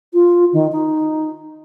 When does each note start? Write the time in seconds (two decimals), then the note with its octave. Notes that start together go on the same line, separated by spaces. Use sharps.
0.13 F4
0.53 D#3
0.72 D#4